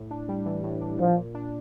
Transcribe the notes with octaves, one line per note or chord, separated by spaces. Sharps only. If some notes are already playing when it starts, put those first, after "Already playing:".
Already playing: A2
D4
G3
E3
A2
D4
A#2 F3
A#2
D4